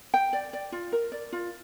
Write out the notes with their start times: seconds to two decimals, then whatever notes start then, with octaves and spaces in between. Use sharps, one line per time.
0.14 G5
0.33 D5
0.53 D5
0.72 F4
0.92 A#4
1.12 D5
1.33 F4